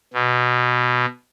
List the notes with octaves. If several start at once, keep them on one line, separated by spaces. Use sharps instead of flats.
B2